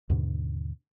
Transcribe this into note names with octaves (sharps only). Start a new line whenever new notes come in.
D#2 G#2 B2 D3